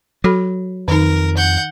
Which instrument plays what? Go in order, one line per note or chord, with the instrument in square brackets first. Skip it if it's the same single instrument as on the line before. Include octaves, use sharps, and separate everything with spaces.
[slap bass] F#3 [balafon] F#4 A4 B5
[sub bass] F2 [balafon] D#3 D#4 [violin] A#4
[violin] F#5 G6